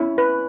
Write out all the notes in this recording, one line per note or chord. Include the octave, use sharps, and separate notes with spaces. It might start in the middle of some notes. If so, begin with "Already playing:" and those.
Already playing: C#4 E4
B4